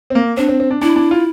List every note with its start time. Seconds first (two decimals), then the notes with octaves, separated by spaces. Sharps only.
0.10 C4
0.15 A#3
0.37 C4 D4
0.48 C4
0.60 C4
0.71 D4
0.82 D4 E4
0.96 D4
1.11 F4